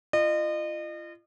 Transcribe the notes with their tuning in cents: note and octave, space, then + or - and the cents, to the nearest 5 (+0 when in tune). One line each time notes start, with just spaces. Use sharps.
F4 -35 D#5 -35